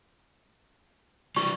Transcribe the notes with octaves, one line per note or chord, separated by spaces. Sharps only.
E3 G3 C#6